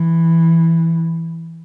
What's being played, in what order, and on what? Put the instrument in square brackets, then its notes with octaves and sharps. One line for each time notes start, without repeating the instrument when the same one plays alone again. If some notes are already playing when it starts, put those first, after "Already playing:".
Already playing: [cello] E3